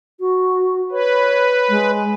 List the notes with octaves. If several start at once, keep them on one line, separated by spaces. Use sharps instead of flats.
F#4
B4 C#5
G#3